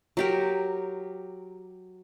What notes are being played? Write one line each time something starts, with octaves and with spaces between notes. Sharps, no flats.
F#3 G4 A#4